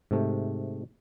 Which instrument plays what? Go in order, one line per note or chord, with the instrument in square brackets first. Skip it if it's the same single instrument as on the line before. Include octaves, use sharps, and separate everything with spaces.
[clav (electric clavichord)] G#2 C3 A3